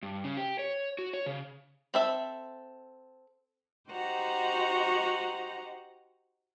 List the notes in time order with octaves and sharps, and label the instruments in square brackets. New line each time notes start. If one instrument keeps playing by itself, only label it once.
[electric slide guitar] G2
C#3
G4
C#5
F#4
C#5
C#3
[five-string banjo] C4 A4 E5
[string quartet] D#4 F#4 G4 C5 F#5 A#5